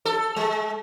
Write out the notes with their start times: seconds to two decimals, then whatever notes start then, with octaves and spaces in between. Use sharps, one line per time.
0.05 A4
0.36 G#3